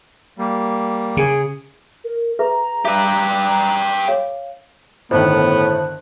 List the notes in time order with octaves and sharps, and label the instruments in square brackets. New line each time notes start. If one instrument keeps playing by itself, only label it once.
[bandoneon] G3 A#3
[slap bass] C#3 [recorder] G#4
[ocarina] A#4
[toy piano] G#4 B4 E5 [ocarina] A#5
[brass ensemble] G3 [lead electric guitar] G4 B4 [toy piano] E5 F5
[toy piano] C#5 F5
[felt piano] G1 D#3 [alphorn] A2 [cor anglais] B3 [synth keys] C5 A5 F#6